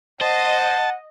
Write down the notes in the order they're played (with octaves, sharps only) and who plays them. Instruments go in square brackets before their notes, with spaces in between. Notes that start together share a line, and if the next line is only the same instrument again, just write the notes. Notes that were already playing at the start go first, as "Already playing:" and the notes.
[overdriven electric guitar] C5 [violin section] D#5 [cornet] F#5 [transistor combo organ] A5